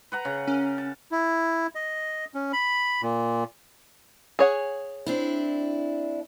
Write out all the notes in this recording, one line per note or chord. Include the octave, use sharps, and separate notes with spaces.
B4 F#5 A#5
C#3
C#4 A#4
A5
E4
D#5
C#4
B5
A#2
G#4 C#5 F#5
C4 D4 E4